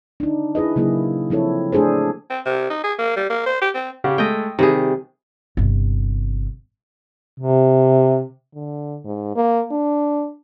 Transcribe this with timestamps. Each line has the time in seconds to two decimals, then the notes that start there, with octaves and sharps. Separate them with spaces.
0.20 D4 D#4
0.55 E4 G#4 B4 D#5
0.76 C#3 F#3 A#3 E4 G#4
1.30 F3 C4 E4 A4 C#5
1.72 A3 D4 G#4 A4 C5
2.30 C4
2.46 C3
2.70 D#4
2.84 G#4
2.99 A#3
3.16 G3
3.30 A#3
3.46 C5
3.62 G4
3.75 C4
4.04 C#3 G4 F#5
4.18 G#3 A3 D#5 G5
4.59 C3 D#3 G3 G#4
5.57 G1 C3
7.40 C3
8.55 D3
9.04 G#2
9.36 A#3
9.71 D4